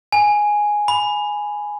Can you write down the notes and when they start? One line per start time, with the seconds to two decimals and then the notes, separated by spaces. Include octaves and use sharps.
0.12 G#5
0.88 B5